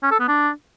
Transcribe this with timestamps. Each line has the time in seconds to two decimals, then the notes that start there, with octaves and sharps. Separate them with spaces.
0.03 C#4
0.11 A4
0.20 B3
0.28 D4